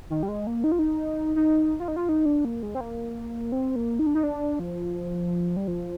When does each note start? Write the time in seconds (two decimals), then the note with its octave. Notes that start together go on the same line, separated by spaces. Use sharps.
0.10 D#3
0.23 G3
0.28 G#3
0.47 A#3
0.64 D#4
0.72 F4
0.79 D#4
1.36 D#4
1.80 F4
1.88 D#4
1.96 F4
2.09 D#4
2.26 D4
2.45 A#3
2.63 G#3
2.75 C4
2.81 A#3
3.52 C4
3.76 A#3
3.99 D#4
4.06 D4
4.15 D#4
4.23 D4
4.59 F3
5.57 G3
5.68 F3